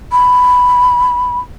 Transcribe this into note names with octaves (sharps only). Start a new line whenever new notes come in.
B5